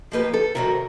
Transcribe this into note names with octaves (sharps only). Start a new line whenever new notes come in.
F3 A#3 D#4 G4 B4
A4
C3 D#3 F#3 A#4